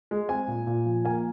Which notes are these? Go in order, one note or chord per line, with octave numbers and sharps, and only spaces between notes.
G#3
C4 G#5
A#2
A#2
F3
A#3 G#5